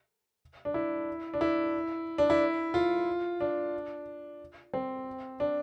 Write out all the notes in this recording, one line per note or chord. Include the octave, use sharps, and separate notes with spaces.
D4
E4
D4
E4
D4
E4
F4
D4
C4
D4